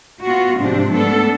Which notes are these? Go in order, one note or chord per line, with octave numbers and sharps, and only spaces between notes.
B3 F4 F#4
G#2 C3 F3 C4 D4
A3 B3 D4 A4